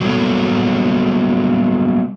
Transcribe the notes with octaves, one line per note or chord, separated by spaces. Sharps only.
F#3 G3 A#3 B3 A4 C#5